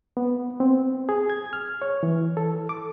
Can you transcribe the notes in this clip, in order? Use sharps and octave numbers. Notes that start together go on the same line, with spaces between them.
B3
C4
G#4
G#6
F6
C#5
E3
A4
D6